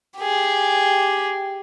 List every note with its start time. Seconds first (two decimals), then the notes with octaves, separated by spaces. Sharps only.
0.18 G4 G#4